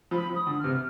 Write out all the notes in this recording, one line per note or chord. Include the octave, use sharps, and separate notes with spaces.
F3 B5
F3
D#6
D3
C3 F6